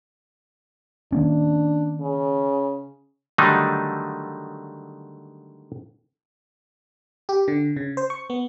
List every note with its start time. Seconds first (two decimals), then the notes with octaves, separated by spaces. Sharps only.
1.12 D#3 A#3 C#4 D4
2.00 C#3
3.38 D3 D#3 F#3 G3 A3 D#4
7.29 G4
7.48 D3
7.76 C#3
7.97 C5
8.10 C#6
8.30 B3